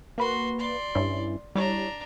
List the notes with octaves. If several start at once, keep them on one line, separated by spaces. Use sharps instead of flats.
A#3 F#4 B4 C6
D5 C6
G2 C#4 E4
G3 D4 E4 C#5 A#5